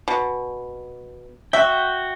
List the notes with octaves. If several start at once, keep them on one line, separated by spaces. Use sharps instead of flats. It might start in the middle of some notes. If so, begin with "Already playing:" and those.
B2
F#4 E5 G5